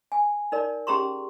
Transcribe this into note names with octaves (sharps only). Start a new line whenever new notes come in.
G#5
D#4 A#4 D5
C#4 G4 G#4 A#5 C6 C#6